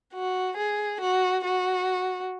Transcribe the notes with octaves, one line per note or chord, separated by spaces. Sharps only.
F#4
G#4
F#4
F#4